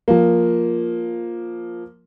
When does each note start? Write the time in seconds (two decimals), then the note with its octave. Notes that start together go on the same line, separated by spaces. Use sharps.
0.08 F3 A#3